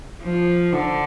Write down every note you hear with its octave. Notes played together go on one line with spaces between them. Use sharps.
F3
D3